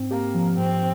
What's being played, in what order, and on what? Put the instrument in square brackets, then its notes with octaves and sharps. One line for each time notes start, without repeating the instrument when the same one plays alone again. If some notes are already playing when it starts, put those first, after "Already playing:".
Already playing: [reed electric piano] G#2 C4
[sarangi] A#3 [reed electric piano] G4
[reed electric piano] F3
[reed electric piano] G#2 [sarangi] C4